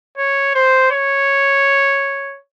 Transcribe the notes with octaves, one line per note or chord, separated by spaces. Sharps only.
C#5
C5
C#5